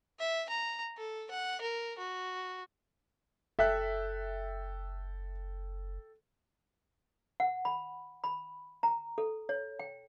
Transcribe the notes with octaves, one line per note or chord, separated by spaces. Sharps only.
E5
A#5
A4
F#5
A#4
F#4
F#1 A4 E5 G5 F#6
F#5
B5
B5
A#5
A4
C#5
G5